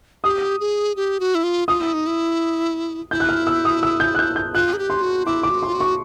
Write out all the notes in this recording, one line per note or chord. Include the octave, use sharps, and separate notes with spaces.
G4 D#6
G#4
G4
F#4
E4
F4
F4 D#6
E4
D#4
E4
E4 G6
F#6
F6
E6
D#6
E6
G6
F#6
G6
G6
F4 F#6
G#4
G4
C6
F#4
E4 D6
D6
F#4
F4 C6
F#4
C#6